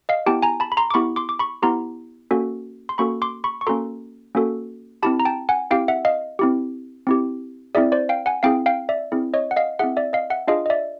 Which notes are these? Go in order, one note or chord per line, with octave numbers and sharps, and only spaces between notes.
D#5 F5
B3 E4 G4 G5 A5
G#5 A#5
A5 B5
B5
A#5 C6
D6
B3 E4 G4 B5 C#6
C6 D6
D6
B5 C#6
B3 E4 G4 A#5 C6
A#3 C#4 F#4 A4
C6
A#3 C#4 F#4 A4 B5 C#6
C6 D6
B5 C#6
C#6
A#3 C#4 F#4 A4 A#5 C6
A#3 C#4 F#4 A4
C4 E4 G4 A5 B5
A#5
G5 A5
F#5 G#5
C4 E4 G4 F5 G5
E5 F#5
D#5 F5
C4 E4 G4
C4 E4 G4
C4 E4 G#4 D5 E5
C5 D5
F5 G5
F#5 G#5
C4 E4 G#4 F5 G5
F5 G5
D5 E5
C4 E4 G#4
C#5 D#5
F#5
D#5 F5
C4 E4 G#4 E5 F#5
D5 E5
D#5 F5
E5 F#5
D4 F4 G#4 D#5 F5
D#5
D5 E5